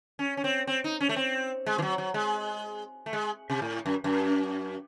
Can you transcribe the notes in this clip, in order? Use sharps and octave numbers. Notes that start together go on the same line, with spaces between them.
C#4
C#4
C4
C4
D#4
C#4
A3
C4
G#3
E3
F#3
F#3
G#3
A3
G#3
C3
A2
F#2
F#2